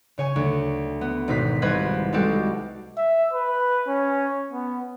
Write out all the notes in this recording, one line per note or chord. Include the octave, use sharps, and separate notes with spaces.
C#3 C#5 G#5
D2
B3
G#1 B2 D#4 C5 B6
C2 C4 B4 C5 D#5 G#6
G3 G#3 C4 F#4 G4 A4
E5
B4
C#4
B3